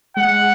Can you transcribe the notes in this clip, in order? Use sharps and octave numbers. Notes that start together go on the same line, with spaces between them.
G#3 F#5